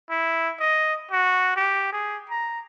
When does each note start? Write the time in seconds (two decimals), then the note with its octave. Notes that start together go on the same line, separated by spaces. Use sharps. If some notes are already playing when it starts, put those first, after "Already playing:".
0.10 E4
0.60 D#5
1.11 F#4
1.56 G4
1.92 G#4
2.29 A#5